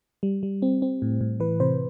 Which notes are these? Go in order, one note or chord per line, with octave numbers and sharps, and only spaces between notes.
G3
G3
C4
C4
A2
A2
E3 B4
C3 C5